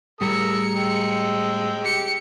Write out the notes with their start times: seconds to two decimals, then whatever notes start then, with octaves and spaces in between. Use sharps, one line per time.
0.21 A2 G3 G#4 A#4 E6 C#7
0.75 G#3 G5 E6
1.83 G4 C#7